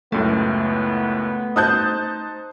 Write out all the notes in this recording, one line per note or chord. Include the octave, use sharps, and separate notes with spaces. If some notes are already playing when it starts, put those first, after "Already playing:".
C#2 F#2 A2 A3 B3
D#4 C5 A5 D#6 F#6 G6